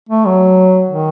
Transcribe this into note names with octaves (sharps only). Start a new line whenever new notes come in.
A3
F#3
D#3